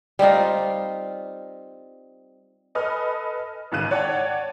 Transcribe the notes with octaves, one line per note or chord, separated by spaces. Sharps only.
G3 C4 D#4 F4
A4 B4 D#5 G#5 D#6 F6
G#1 C#2 D#3 F#6 D#7 E7
C#5 D5 F#5 G5 A5